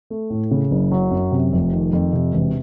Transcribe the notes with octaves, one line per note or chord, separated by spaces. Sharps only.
A3
A2
C#3
F#1
F#3
F#2
C3
F1
D#3
F2
C3
E1